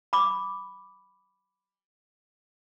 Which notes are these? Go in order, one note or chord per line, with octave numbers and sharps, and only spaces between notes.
B5 D6